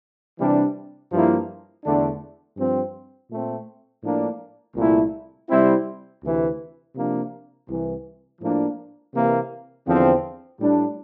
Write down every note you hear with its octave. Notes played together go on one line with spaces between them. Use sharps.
C3 E3 G3 D4
G2 F3 A#3 E4
E2 D3 A3 D4
G2 F3 C4
A#2 A3 C4
A2 F3 A#3 D4
C2 A#2 A3 E4
C3 G3 C4 E4
D2 C3 E3
C3 F3 A#3 D4
C2 C3 E3
A2 F3 A#3 D4
C3 E3 A#3
E2 D3 F3 C4
A2 G3 D4